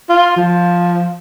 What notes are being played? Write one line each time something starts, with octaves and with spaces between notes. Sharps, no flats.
F4
F3